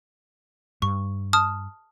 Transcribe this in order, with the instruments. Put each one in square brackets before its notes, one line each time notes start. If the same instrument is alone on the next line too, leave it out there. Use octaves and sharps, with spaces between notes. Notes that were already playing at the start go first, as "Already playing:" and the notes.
[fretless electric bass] G2 [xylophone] C#6
[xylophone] A5 D#6 F6